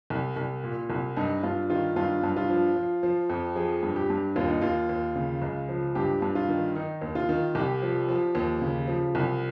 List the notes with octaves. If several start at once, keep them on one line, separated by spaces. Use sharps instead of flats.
C2
C2
A#2
C2
G2 D#4
G2 F4
D#3 F4
G2 F4
G2
F4
F3
F3
F3
F2
F3 G#4
G2
G4
G2
D#2 F4
D#4
D#2 F4
D#2
C#3
C#2
F3
G2 G4
G2
F4
D#3
D#3 D#4
D#2
F4
D#3
C2 G4
F3
F3
D#2
C#3
F3
C2